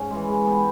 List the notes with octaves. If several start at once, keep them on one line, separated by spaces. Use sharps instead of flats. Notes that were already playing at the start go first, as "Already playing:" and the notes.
Already playing: G#2 C#4
E3 G#3
G#3
B3 G4